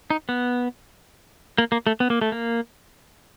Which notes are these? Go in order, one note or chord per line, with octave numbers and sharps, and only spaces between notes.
D#4
B3
A#3
A#3
A3
B3
A#3
A3
A#3